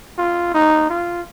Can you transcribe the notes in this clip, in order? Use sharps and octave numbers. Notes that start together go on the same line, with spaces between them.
F4
D#4
F4